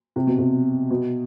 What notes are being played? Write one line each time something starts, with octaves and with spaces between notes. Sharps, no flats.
C3
B2
C3
B2